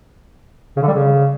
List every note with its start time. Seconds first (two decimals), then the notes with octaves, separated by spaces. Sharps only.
0.77 C#3
0.82 D3
0.88 G3
0.93 C#3